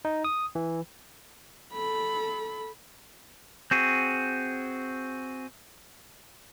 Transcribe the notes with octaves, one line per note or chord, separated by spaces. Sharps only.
D#4
D#6
E3
A4 B5
C4 F#4 G#4